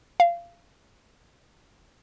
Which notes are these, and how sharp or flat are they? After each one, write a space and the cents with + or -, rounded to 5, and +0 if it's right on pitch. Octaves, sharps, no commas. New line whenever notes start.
F5 -20